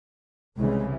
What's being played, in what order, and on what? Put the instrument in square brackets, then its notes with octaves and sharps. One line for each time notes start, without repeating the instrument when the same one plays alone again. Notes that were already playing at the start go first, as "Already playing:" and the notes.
[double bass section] C2 C#3 E3 [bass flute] G#3